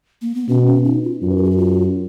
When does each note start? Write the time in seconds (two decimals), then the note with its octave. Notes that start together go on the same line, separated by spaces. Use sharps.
0.22 A#3
0.35 B3
0.49 B2 C#4
0.67 C#4
0.85 D#4
1.04 F4
1.21 F#2 F4
1.30 B4
1.37 A#4
1.44 G#4
1.51 F#4
1.58 F4